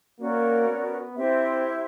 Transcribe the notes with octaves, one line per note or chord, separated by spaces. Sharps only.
A#3 C#4 F#4 A#4 D5
B3
C4 E4 G4 C5 E5